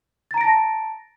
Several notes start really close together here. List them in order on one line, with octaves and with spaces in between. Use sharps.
A6 A#5 D7 A#6 A5